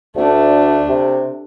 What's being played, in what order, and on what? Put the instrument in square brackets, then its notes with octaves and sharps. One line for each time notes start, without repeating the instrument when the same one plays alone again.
[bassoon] D2 [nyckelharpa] A3 D4
[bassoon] C3